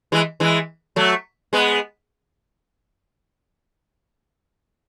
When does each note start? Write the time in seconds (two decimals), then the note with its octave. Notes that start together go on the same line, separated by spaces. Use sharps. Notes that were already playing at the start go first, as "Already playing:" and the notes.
0.12 E3 G#3
0.40 E3 G#3
0.96 F#3 A3
1.53 G#3 B3